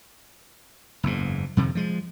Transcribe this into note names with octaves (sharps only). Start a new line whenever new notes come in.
F#1 E2 G#2
F2 C3 D#3
F3 G#3